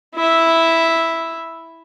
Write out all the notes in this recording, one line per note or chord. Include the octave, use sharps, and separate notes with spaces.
E4 E5